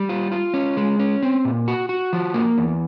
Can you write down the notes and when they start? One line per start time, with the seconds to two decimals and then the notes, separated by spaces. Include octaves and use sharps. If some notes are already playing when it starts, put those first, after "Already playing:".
Already playing: G3
0.09 F4
0.31 F4
0.54 C#4
0.77 G#3
1.00 C#4
1.23 C4
1.45 A#2
1.68 F#4
1.89 F#4
2.13 F3
2.34 A#3
2.58 E2